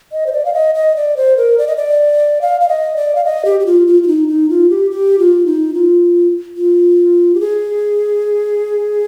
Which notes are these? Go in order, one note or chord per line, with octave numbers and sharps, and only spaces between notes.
D#5
C5
D5
F5
D#5
D#5
D5
C5
A#4
D5
D#5
D5
F5
F5
D#5
D5
F5
D#5
G4
G4
F4
F4
F4
D#4
D#4
F4
G4
G4
F4
D#4
F4
F4
G4
G#4